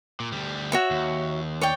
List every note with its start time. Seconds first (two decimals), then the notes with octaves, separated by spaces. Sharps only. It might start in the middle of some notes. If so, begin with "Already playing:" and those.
0.20 A#2
0.32 D2 G3
0.72 F#4 C#5 E5
0.91 D#2
1.61 C#5 D5 G5